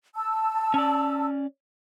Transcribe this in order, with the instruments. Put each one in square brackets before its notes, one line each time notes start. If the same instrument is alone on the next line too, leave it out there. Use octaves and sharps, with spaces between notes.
[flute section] A5 E6
[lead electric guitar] C#4 D5